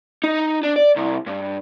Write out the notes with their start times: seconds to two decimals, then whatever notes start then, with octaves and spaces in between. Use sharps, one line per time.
0.24 D#4
0.63 D4
0.76 D5
0.96 C2
1.27 G2